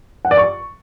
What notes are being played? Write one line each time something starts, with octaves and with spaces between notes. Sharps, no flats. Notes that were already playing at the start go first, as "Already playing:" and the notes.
F#5
D5
C#6